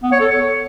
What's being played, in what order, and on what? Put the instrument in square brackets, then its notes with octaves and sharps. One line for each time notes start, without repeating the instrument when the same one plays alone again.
[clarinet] B3
C#5
A4
C#5